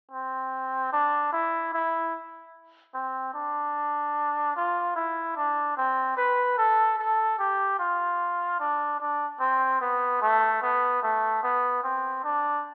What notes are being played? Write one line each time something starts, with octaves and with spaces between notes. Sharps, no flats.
C4
D4
E4
E4
C4
D4
F4
E4
D4
C4
B4
A4
A4
G4
F4
D4
D4
C4
B3
A3
B3
A3
B3
C4
D4